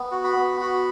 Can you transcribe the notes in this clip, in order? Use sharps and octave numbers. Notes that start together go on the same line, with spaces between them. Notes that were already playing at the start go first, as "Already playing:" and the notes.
Already playing: B3
F#4
B5
B3
F#4